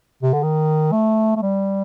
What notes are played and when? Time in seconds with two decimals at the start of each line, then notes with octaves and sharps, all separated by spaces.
0.23 C3
0.34 D3
0.43 D#3
0.92 A3
1.37 A3
1.42 G3